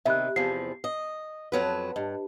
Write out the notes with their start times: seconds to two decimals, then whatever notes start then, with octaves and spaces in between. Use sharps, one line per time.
0.06 C3 D#3 E5 B5 F#6
0.36 E2 C3 F3 C7
0.84 D#5
1.52 F2 F#3 B4
1.96 G2 D#5